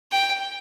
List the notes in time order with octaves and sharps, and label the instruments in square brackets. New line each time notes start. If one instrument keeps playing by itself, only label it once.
[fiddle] G5